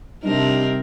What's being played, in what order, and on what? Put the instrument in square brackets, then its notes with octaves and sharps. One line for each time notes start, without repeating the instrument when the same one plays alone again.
[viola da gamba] C3 C4 A#4 [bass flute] G3 [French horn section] D4 [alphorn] D#4